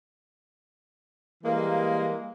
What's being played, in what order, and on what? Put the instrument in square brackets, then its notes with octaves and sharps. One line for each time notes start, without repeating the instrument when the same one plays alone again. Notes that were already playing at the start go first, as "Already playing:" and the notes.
[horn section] E3 G3 G#3 A#3